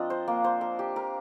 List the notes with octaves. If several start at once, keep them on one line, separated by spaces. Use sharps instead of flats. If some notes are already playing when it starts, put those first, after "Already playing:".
Already playing: F3 C4 D4 A#4 D#5
C5
A#3
C5
A#4
G4
A#4